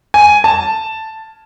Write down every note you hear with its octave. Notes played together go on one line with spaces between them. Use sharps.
G#5
A5